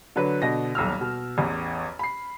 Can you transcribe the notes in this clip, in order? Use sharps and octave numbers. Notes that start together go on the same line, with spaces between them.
D3 F#3 B4
B2 D3 D#5 A#6
D#1 B1 E6 F6
B2
A1 E2
B5 C7